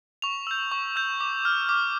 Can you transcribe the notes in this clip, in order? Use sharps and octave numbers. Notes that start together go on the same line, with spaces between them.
C#6 F7
E6 G6
C#6
E6 G6
D6
F6
D6